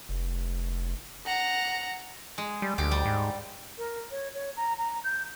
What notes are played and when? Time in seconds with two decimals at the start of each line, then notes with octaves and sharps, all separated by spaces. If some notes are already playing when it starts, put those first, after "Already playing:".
0.09 F1
1.26 F#5 A#5
2.38 G#3
2.62 G3
2.78 D2 G4
2.91 G3
3.05 G#2
3.77 A#4
4.11 C#5
4.34 C#5
4.56 A#5
4.78 A#5
5.04 G6